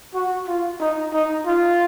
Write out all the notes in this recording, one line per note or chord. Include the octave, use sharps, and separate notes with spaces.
F#4
F4
D#4
D#4
F4